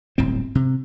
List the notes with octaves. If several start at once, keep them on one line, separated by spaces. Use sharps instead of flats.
D1 G1 A2 C4
C3